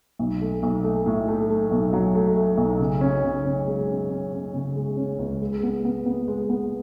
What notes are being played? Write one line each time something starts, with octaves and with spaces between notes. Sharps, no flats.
B1
A3
B1
A3
A2
A3
A3
B1
F#3
A3
A3
B1
C#3
C#4
C#3
C#4
G#3
C#4
C#4
C#4
C#3
G#3
C#4
C#2
G#3
B3
B3
B3
G#3
B3